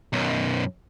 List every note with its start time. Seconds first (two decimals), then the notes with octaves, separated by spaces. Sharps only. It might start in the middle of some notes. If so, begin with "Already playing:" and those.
0.13 B1 F#2